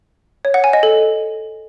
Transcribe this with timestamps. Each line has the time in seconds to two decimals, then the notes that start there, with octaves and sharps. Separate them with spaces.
0.45 C#5
0.54 F#5
0.64 G#5
0.73 D#5
0.83 A4